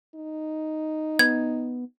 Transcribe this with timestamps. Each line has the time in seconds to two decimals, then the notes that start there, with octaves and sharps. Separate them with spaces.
0.15 D#4
1.19 B3 G#6